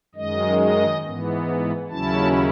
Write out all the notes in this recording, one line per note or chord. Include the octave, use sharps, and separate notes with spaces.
F#2 D#3 G#3 D#5
D#5
G#2 E3 B3
D#2 C#3 F#3 C#4 E4 A5